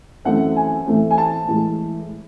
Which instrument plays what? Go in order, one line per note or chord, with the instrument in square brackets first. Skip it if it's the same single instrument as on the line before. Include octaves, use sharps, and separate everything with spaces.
[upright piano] F#2 E3 A3 C4 F#5
G#5
A2 E3 A3 C4
G#5
A5
A2 E3 G#3